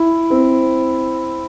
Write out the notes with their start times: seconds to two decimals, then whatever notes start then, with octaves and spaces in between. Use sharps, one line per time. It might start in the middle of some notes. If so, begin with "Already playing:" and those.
Already playing: E4
0.30 C4